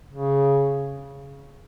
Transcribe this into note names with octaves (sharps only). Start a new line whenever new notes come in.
C#3